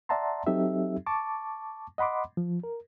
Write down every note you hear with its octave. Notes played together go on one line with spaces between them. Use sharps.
D5 E5 F#5 A5 A#5 C6
F#3 C4 D#4 G4 A4 E5
A5 C#6 D6
D#5 F#5 B5 C6 D6
F3
A#4